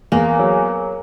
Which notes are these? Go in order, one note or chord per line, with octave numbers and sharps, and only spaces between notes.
E2 A#3
F#3